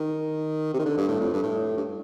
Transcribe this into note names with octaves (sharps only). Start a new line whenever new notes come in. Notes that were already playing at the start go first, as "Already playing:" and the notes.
Already playing: D#3
C3
D#3
D3
G2
A2
F2
G2
A2
G2